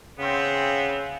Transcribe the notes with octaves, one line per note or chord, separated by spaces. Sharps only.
C#3 B3 C4